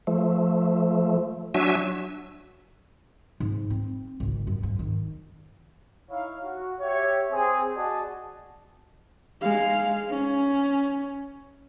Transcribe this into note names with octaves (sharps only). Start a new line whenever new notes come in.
F3 A3
F#3 D4 F#4 E5 G#5 E6
G#2
C4
G#1 C#2
F#2
G#2
D#3
D#4 E4 C#5 F5
F#4
G4 C#5 E5
C4 G#4
F#4 G#4 D5 D#5 G#5 A5
G#3 F5
C#4